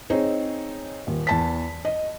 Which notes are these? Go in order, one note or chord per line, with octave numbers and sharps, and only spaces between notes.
C4 D#4 G#4 C5 C#5
D#1
E2 A5 B6
D#5